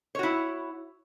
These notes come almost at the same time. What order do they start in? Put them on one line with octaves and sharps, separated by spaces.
C#5 F#4 E4